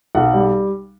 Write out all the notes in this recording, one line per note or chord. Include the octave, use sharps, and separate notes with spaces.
B1 F#5
G3